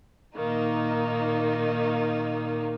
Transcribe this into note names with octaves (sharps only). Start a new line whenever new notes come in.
A#2 D#3 A#3 D#4